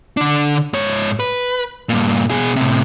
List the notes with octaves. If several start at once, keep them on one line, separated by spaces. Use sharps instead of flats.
D3 D4
G#2 C#5
B4
G2 A#2
B2 G#4
A2 C3